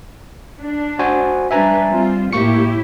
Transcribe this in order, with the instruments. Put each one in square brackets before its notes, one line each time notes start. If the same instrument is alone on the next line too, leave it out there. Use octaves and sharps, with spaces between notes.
[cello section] D4
[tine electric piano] F#4 C5 G#5
[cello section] G3 D4 B4 [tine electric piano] E5 G#5 A#5
[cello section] G3 C4 F4
[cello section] A2 E4 G4 [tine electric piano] A#3 C#6 C#7